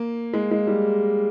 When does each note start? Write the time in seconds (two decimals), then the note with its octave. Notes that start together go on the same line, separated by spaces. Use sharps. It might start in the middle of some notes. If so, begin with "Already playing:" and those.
Already playing: A#3
0.34 G#3
0.51 G#3
0.67 G3